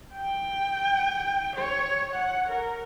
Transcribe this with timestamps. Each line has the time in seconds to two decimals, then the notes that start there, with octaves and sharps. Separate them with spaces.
0.15 G5
1.56 C#5
2.14 F#5
2.49 A#4